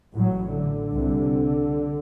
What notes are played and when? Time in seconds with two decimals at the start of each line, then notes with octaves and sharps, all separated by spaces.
0.15 A1 A2 F#3
0.55 D3
0.94 C2 C3